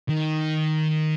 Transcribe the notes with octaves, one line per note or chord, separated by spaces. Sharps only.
D#3